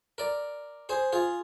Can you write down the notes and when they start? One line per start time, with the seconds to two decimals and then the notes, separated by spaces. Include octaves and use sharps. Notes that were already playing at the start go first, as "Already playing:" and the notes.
0.18 A#4 D5
0.89 G#4 C5
1.13 F4 G#4